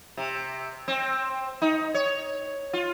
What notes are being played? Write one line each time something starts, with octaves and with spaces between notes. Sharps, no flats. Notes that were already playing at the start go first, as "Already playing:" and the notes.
C3
C4
D#4
C#5
F4